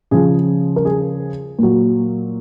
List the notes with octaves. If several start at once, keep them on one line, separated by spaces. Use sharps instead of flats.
C#3 F3 G#4
A#4
G#4
A#2 F#3